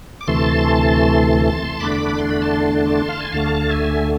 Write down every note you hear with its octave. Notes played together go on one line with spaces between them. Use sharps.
D6
D2 C3 E3 A3 A5 C6
E2 D3 A3 D4 B5 D6
C6
B5
A5 C6
F5
G#5
D2 D3 A3 F5 A5
E5 G#5